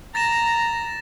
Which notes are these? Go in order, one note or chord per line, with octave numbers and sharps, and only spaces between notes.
A#5 A6 A#6 E7